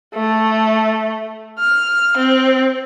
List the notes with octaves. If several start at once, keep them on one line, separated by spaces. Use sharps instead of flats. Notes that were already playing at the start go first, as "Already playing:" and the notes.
A3
F6
C4